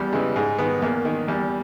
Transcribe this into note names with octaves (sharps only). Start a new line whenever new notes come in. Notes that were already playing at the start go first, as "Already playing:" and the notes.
Already playing: E2 G3
C#3 E3 G#3
G#2 G#3
D#3 B3
E2 A#3
D#3
E2 G3